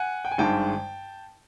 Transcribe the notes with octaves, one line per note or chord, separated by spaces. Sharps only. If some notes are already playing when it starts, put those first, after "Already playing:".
Already playing: F#5 G#5
G5
G#5
G#1 G2 D#3 G#3 G5 A5